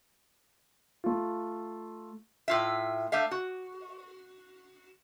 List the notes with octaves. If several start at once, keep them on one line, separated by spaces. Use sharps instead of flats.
A3 F4
A2 F4 E5
A3 D4 E5 F5
F#4